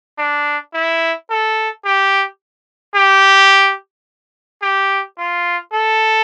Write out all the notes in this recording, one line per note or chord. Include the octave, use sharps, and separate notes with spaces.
D4
E4
A4
G4
G4
G4
F4
A4